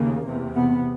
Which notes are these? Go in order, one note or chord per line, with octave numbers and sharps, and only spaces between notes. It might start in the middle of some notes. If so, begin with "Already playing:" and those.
Already playing: D#2 C#3 A#3
E2 C3
B3